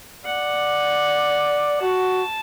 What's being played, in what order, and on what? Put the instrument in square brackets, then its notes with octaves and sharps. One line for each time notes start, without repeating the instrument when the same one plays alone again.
[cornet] D5 [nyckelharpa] F#5
[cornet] F#4 [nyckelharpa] A5